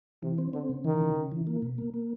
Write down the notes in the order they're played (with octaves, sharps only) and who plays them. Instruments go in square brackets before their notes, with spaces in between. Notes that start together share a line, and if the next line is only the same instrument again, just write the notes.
[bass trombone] C3 [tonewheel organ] E3
[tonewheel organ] C4
[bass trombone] D3 [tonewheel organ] C4
[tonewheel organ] C#3
[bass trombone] D#3 [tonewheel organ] E3
[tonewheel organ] C#3
C#3
E3
A#3
B2
A#3
A#3